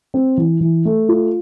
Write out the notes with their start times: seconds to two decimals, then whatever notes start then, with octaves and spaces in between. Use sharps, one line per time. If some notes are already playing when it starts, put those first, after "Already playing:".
0.14 C4
0.37 E3
0.60 E3
0.85 A3
1.09 F4